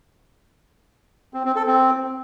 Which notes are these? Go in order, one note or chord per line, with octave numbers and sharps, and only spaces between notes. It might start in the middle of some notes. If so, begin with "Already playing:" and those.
C4
C4
A4
C4